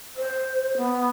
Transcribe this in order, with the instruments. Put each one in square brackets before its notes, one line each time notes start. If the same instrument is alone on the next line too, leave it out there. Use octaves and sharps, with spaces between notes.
[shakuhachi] C5
B3